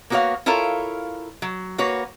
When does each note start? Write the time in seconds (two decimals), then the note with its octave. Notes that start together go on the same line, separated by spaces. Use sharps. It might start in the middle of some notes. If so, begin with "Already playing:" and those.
0.10 A#3 B3 F#4 G#4 C#5 F5
0.46 E4 F4 A4 A#4 C#5 F5
1.42 F#3
1.78 A#3 F#4 B4 C#5